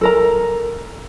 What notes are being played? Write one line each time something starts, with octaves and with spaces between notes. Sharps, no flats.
A4 A#4 A#5